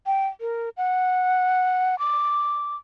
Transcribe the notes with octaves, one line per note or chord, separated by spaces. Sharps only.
G5
A#4
F#5
D6